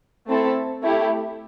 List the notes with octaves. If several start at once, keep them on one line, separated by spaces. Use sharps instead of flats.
A3 C4 E4 A4
A3 E4 G4